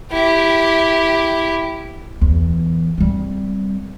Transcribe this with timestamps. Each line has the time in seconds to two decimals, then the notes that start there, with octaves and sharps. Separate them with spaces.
0.12 E4 G4
2.21 E2
2.98 G3 C4